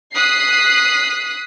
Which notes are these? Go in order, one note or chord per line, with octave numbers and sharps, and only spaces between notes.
D#6 F#6 B6 C7